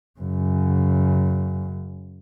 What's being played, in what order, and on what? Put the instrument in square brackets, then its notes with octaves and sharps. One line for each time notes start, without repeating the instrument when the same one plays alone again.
[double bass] F#2 C#3